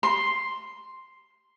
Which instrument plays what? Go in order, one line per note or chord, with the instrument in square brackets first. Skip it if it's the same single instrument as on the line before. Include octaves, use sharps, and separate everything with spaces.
[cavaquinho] C6